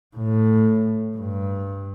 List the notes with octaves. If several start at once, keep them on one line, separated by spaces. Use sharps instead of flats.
A2
G2